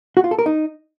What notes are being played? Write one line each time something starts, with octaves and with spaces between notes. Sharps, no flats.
F#4
F4
A4
A#4
D#4